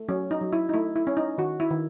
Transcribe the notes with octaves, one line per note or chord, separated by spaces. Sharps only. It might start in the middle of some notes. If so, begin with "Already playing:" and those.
Already playing: A3
F#3 C#4
D#4
F#3
E4
D#4
A3 E4
E4
C#4
D#4
D#3 F#4
E4
D#3